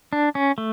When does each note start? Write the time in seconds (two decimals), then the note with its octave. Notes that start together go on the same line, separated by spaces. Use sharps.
0.13 D4
0.35 C#4
0.58 A3